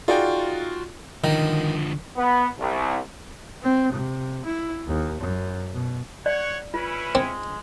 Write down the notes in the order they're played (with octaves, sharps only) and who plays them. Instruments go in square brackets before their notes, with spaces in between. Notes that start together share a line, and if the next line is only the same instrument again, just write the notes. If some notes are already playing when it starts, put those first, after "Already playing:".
[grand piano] D#4 G#4 D5 [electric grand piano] F4 F#4 G5
[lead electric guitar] D3 F3 [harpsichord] D#3
[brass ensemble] B3
C2
[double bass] C4
C3
E4
D#2
F#2
B2
[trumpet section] C#5 F#5 [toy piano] D5
[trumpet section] C#4 E4 [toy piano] F4 [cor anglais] B4
[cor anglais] G#3 [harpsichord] C4